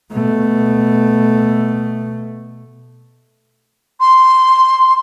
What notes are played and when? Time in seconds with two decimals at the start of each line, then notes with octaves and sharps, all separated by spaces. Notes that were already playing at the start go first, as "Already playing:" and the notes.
0.11 B2 A3
4.00 C6